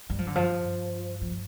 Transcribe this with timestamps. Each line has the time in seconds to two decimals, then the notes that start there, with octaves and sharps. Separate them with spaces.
0.09 G2 G3
0.19 F3
0.27 D3
0.35 G2 F3
0.66 G2
1.21 F3